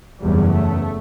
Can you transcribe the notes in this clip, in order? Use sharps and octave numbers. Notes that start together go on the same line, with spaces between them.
F#1 E2 C#3 G3
A3